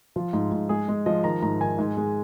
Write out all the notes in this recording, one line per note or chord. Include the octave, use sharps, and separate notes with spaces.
F3 F4
G#2
G#2
G#3 G#4
G#3
F3 D#5
D#3 A#5
G#2 A#5
D#3 G#5
G#2
G#3